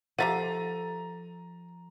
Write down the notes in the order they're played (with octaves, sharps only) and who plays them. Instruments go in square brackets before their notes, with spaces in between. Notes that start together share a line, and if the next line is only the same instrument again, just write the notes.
[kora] F3 [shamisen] G4 E5 F#5 [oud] A4 [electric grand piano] A#5 A6 D#7